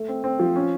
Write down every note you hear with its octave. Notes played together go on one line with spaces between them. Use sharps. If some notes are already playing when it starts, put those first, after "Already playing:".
Already playing: A3
C4
C4
F3
C#4